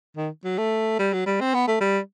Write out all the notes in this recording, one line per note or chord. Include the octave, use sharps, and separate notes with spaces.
D#3
F#3
A3
G3
F#3
G3
C4
B3
A3
G3